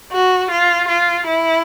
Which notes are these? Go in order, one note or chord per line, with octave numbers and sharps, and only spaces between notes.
F#4
F4
F4
E4